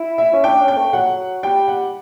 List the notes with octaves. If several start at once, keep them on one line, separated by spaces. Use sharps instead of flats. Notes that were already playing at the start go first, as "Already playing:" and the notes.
Already playing: E4
E5
C#4
D4 G5
C#4
G5
A3
F#3 F#5
G3 G5
F#5